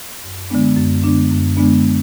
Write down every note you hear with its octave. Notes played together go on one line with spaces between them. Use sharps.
F#2
D3 G#3 B3 D4
F#2
D3 G#3 B3 D4
F#2
D3 G#3 B3 D4